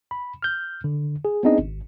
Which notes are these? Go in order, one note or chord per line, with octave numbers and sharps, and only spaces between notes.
B5
F6 G6
D3
G#4
B3 C4 D4 D#4 G#4 D#5
G#1